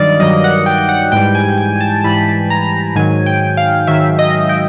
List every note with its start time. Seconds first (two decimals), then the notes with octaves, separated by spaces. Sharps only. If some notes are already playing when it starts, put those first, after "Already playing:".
Already playing: G2 D#3 F#3 D5 D#5 F5
0.20 G2 D#3 F#3 D#5
0.44 F#5
0.66 G5
0.78 G5
0.89 F#5
1.12 G#2 E3 G3 G5
1.35 G#5
1.58 G#5
1.81 A5
2.04 G#2 E3 G3 B5
2.50 A#5
2.95 G#2 D#3 F#3 G#5
3.26 G5
3.57 F5
3.87 G#2 D#3 F#3 E5
4.19 D#5
4.49 G5